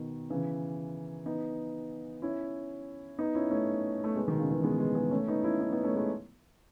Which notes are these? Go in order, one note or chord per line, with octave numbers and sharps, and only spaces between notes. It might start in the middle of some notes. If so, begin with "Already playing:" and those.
Already playing: B2 D#3
C#3 E3
B3 D#4
C#4 E4
B3 D#4
C#4 E4
A3 C#4
A3
G#3 B3
B2 D#3
C#3
C#3 E3
G#3 B3
G#3 B3
G#3 B3
A3 C#4
B3 D#4
C#4 E4
B3 D#4
B3 D#4
A3 C#4
G#3 B3